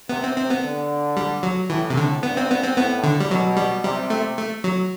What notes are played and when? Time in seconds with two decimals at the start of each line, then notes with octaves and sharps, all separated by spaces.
0.09 C3 B3
0.24 C4
0.37 C4
0.50 B3
0.63 D3
1.17 G3
1.43 F#3
1.70 A2 E3
1.90 C3
1.97 D3
2.23 G2 B3
2.37 C4
2.51 B3
2.63 C4
2.77 A2 B3
3.04 D3
3.20 G3
3.31 B2 F#3
3.57 G3
3.84 C3 G3
4.10 A3
4.37 A3
4.64 F#3